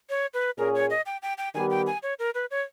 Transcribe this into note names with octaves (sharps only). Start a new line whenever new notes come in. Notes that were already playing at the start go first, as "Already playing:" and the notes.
C#5
B4
A#2 A#3 C#4 G#4 A#4
C#5
D#5
G5
G5
G5
D#3 G3 B3 G4 G#5
G5
G#5
C#5
A#4
B4
C#5